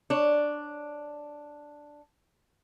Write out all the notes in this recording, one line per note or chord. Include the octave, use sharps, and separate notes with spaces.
D4 C#5